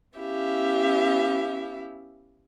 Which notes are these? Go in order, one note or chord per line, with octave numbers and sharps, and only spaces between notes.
B3 C#4 E4 G4 E5 F5